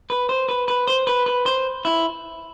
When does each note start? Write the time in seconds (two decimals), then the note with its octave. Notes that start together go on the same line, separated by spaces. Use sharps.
0.10 B4
0.29 C5
0.49 B4
0.68 B4
0.87 C5
1.07 B4
1.26 B4
1.46 C5
1.85 E4